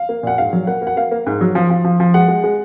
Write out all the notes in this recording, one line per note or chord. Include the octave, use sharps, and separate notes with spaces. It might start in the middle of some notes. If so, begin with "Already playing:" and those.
Already playing: F5
A#3
A#2 F#5
G#2 F5
F#3
A#3 F#5
A#3
F#5
A#3 F5
A#3
G#2
F#3
F3
F3
F3
F3
G#3 F#5
G#3
G#3